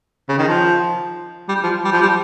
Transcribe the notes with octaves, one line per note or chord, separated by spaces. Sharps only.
C#3
D#3
F3
G3
F3
G3
F3
G3